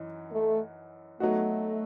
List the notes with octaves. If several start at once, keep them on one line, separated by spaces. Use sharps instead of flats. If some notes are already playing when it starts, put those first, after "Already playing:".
Already playing: F#2 E3 D#4
A3
F#3 A3 B3 D#4 F#4